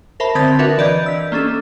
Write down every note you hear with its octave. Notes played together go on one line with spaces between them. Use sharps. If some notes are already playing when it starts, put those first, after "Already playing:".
A#4 C5 E5 A5 B5
D3 C4 D#6 G#6 A6 B6
D4 F#4 A#4 B4 E5 F#5
E3 D5 D#5 G6 G#6
E6 B6
A#3 C#4 D4 A4